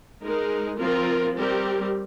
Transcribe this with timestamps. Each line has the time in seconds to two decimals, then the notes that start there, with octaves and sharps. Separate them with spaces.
0.23 G#3 D#4 A#4
0.79 F3 C4 F4 A#4
1.36 G3 C4 G4 A#4